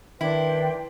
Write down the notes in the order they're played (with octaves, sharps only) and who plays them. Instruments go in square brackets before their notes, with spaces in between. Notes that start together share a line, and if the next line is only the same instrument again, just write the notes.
[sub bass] D#3 [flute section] D4 G5 C6 [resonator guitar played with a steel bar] E4 [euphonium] B4